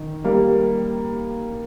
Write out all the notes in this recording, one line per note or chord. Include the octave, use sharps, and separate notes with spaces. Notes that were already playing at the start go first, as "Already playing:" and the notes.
Already playing: D#3
G3 A#3